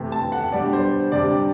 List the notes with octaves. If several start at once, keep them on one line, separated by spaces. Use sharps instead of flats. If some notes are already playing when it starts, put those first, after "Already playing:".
Already playing: C3 E3 A3
A5
F#5
B2 G3 D4 D5
C5
C3 G3 D4 D5